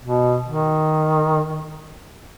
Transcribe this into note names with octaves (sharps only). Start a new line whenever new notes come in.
B2
D#3